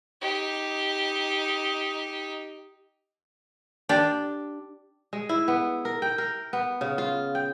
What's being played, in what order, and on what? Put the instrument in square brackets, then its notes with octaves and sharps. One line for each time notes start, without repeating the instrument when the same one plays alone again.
[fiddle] D#4 G4
[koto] D4 G4
[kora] G#3
E4
B3
A#4
G5
A#4
B3
C#3
F4
G5